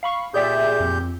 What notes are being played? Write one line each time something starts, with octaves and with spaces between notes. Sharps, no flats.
F5 B5 C#6
A#2 G4 G#4 D5 E5 G6
F2